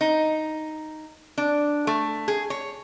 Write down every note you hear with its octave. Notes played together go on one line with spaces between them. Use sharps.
D#4
D4
A3
G#4
C#5